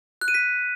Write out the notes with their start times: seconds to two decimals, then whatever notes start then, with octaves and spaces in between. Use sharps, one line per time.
0.21 F#6
0.28 D#7
0.34 B6